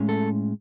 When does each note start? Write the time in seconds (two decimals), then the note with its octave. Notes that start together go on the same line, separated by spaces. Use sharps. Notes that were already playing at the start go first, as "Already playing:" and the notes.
Already playing: A2 G#3 C#4
0.09 A4